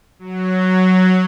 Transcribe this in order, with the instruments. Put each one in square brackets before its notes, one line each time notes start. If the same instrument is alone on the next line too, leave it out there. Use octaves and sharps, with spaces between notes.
[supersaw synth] F#3